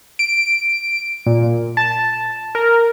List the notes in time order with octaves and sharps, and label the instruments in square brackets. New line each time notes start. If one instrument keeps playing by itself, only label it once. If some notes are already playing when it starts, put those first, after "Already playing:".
[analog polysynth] D7
A#2
A5
A#4